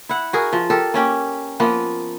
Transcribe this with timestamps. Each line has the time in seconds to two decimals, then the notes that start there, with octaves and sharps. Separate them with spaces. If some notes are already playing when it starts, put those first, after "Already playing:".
0.09 E4 F#5
0.33 F#4 G#4 A#4
0.53 F3
0.70 G4 A4 A#4
0.94 A#3 C#4 G4
1.60 F3 A#3 B3